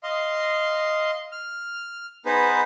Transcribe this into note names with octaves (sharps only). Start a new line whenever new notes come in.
D#5 F5 C6
F6
B3 D#4 G#4 B4 C5